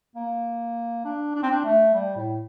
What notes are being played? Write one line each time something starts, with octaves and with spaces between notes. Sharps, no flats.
A#3
D4
D4
C4
D4
A3
G3
A2